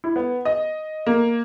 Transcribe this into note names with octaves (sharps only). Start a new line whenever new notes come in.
E4
B3
D#5
A#3